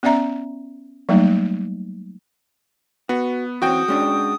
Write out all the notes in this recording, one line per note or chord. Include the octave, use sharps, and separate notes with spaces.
B3 C#4 D5 E5 A#5
F#3 G3 A3 A#3 D#4
B3 F#4
E3 C4 C#4 F#4 G5 D#6
G#3 C#4 D4